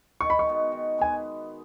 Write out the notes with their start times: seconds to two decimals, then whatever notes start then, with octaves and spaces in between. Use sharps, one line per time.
0.21 D#3 C#6
0.30 B5
0.39 C#6
0.47 G#3 B3 F#4
0.72 D#3
0.98 G#3 B3 F#4 G#5